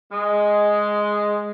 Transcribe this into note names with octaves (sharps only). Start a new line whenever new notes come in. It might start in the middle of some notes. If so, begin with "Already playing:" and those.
G#3